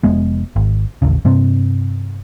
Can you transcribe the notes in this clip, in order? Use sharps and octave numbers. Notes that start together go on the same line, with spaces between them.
F1 F2 G#3 B3
G#1
A1 D#2 C#3
G2 C3 C4